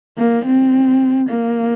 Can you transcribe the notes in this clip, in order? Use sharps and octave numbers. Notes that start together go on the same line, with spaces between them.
A#3
C4
A#3